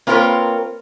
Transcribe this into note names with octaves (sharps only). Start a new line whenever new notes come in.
A#3 C4 F4 A#4 B4 C#5